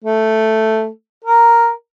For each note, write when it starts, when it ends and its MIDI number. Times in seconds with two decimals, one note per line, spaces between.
0.04 0.87 57
1.24 1.70 70